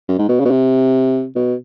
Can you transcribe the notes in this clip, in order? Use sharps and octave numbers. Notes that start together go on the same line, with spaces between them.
F#2
G#2
B2
C#3
B2
C3
B2